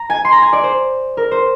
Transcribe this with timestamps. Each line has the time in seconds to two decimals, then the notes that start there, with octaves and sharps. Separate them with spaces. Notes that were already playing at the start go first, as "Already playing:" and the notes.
Already playing: A#5
0.10 G#5
0.25 C6
0.32 A#5
0.42 G#5
0.53 D5
0.63 C5
1.17 A#4
1.31 C5